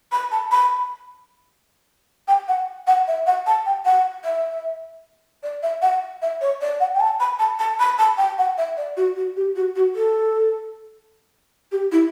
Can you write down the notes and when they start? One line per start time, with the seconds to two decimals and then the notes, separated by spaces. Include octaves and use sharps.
0.12 B5
0.31 A5
0.51 B5
2.28 G5
2.48 F#5
2.87 F#5
3.07 E5
3.27 F#5
3.46 A5
3.66 G5
3.85 F#5
4.25 E5
5.43 D5
5.63 E5
5.82 F#5
6.22 E5
6.41 C#5
6.61 D5
6.80 F#5
6.94 G5
7.00 A5
7.20 B5
7.39 A5
7.59 A5
7.79 B5
7.99 A5
8.18 G5
8.38 F#5
8.58 E5
8.77 D5
8.97 F#4
9.16 F#4
9.36 G4
9.56 F#4
9.76 F#4
9.95 A4
11.72 G4
11.92 E4